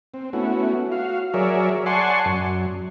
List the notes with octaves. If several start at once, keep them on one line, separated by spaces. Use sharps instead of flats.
C4
A3 B3 C#4 E4 F#4
F#4 F5
F#3 G#4 A#4 C#5 D5 E5
D5 F#5 G#5 A5 C6 C#6
F#2